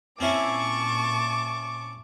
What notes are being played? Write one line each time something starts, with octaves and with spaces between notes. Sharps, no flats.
A#2 C4 C#4 E4 A5 C#6 D6